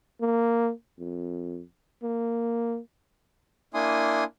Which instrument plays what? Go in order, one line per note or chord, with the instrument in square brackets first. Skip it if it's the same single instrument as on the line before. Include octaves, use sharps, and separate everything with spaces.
[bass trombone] A#3
F2
A#3
[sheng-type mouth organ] A#3 D4 E4 G#5 C6 D#6